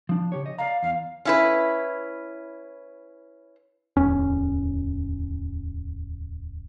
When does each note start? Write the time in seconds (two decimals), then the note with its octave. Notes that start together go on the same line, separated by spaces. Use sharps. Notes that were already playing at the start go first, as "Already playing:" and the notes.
0.09 F3 D4
0.32 C#3 G4 C#5
0.46 D#5
0.58 D5 F5 A#5
0.83 E2 F5
1.25 C#4 E4 B4
3.97 D1 E2 C#4